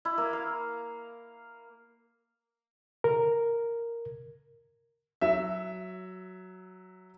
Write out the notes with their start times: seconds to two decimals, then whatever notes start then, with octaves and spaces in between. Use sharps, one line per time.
0.05 E4
0.18 A#3
0.33 F5
3.04 A#4
5.21 F#3 E5